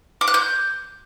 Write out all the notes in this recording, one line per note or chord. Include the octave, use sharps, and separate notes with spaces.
D6
F#6
G6